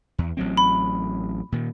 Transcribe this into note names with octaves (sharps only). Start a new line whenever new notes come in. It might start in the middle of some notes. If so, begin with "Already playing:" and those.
E2
A1 F#3 C4
B5
A#2 D#3